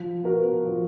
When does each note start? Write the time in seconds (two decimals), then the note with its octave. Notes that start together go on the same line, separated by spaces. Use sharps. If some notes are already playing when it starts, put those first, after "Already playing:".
Already playing: F3
0.23 B3 F#4 A#4
0.65 F3